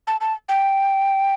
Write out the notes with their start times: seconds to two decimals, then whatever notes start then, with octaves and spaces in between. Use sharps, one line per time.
0.07 A5
0.21 A5
0.49 G5